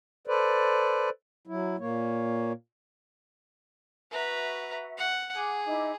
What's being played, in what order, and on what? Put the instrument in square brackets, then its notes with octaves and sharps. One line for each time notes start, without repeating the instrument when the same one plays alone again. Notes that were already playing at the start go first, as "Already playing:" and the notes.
[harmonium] A4 B4 C5 D5
F#3 E4
A#2 A#3 C#5
[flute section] F#4 E5 [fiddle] B4 A#5
[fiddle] F#5
[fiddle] G#4 [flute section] F#5 D6 G#6
[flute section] D#4 E4 D6